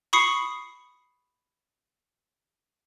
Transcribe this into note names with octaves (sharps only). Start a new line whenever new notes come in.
B5 C#6 D#6 C7 C#7